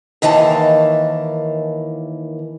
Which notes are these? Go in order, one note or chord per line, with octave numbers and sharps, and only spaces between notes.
D#2 D#3 E3 A#3 G4 A5